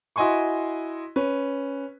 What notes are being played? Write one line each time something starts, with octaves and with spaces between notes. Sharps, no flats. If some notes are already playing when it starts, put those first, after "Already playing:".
E4 F#4 D#5 G#5 C6 C#6
C#4 B4